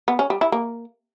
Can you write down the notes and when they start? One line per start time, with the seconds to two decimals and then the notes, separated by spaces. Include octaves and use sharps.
0.08 B3
0.19 C#4
0.30 G3
0.41 E4
0.52 A#3